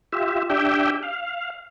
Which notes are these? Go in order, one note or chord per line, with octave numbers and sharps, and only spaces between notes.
F4 G4 E5
D4 G4 E5 G5
F5